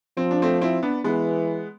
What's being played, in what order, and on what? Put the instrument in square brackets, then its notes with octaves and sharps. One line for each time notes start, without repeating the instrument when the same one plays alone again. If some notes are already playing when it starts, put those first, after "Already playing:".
[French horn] F3 [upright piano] C4
[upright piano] D4
A3 C4
C4 E4
B3 D4
[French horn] E3 [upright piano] G#3 B3